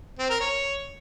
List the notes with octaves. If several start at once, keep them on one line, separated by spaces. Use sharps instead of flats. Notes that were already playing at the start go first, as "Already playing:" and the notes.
C4
A#4
C#5